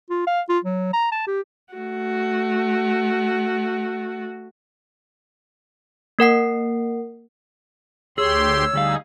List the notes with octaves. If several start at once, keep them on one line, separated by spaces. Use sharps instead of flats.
F4
F5
F4
F#3
A#5
A5
G4
A3 F#4
A#3 A#4 F#5 C7
D2 G4 G#4 C#5 C6 E6
D2 G3 D#4 G#4 F5